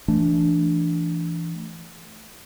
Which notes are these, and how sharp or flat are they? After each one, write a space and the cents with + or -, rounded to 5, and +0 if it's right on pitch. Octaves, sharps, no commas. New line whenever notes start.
E3 +20 A3 +0 D4 +0